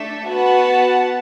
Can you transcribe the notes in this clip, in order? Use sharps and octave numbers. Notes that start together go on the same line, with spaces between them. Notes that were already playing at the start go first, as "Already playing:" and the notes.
Already playing: A3 D4 A4 E5
B3 F#4 B4 F#5 A5